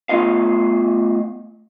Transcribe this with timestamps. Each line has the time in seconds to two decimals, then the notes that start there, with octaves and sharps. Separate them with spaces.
0.09 A3 B3 F4 D#5 F5